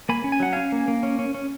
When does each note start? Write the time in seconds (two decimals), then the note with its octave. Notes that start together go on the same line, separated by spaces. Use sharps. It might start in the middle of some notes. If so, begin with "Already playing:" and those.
0.09 A#3 G#5 B5
0.24 C#4
0.32 G#5
0.40 F#3 F#5
0.53 C#4 F5 G#5
0.72 A#3
0.88 A#3
1.03 C#4
1.19 C#4
1.34 C#4